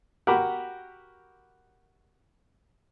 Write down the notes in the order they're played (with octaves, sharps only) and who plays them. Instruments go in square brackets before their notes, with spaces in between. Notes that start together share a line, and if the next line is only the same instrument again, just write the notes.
[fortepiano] F#4 G4 A#4 B5 D6